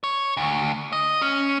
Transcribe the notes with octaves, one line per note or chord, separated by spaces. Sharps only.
C#5
D2
D#5
C#4